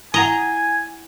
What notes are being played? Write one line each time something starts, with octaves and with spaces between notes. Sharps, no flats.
E4 D#5 F#5 G#5 A#5